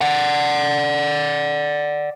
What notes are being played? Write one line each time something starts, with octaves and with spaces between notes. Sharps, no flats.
D5 F#5